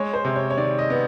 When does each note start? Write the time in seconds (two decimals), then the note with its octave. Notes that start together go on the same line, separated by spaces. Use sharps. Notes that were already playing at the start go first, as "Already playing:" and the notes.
Already playing: G#3 C#5
0.14 C5
0.25 C3
0.36 C#5
0.51 C#5
0.57 D#3 D5
0.79 D#5
0.90 B3